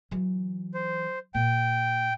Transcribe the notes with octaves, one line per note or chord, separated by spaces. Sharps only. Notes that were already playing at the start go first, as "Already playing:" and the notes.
E3 F#3
C5
A#2 G5